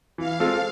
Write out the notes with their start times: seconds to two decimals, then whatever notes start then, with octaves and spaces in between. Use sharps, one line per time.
0.18 E3 F5
0.40 G#3 C4 F4 A4